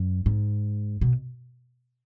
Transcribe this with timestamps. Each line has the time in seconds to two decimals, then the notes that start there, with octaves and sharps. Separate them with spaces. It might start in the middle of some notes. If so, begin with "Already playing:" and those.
Already playing: F#2
0.26 G#2
1.01 B2